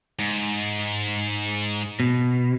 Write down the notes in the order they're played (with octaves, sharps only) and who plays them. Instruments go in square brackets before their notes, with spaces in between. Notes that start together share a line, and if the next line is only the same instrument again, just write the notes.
[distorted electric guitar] G#2
[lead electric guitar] B2